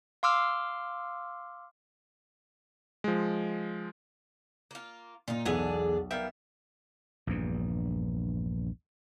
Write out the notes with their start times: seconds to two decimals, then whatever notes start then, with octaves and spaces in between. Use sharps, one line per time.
0.23 F5 C6 D6 E6 F6
3.04 F3 G#3
4.71 A#3 F4
5.28 A#2 D#4 F4
5.46 B1 E2 B3 D4 G#4 A4 G#5
6.11 G3 B3 A#4 E5 F5 G5
7.27 A#1 E2 G2